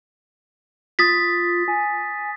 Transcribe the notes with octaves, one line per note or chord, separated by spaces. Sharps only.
F4 D#6 A6 B6
G#5